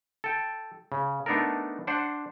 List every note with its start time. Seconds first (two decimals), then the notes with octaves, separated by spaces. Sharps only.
0.24 A4 G5
0.92 C#3
1.26 A3 B3 D4 D#4 A4 A#4
1.87 D4 C5 F#5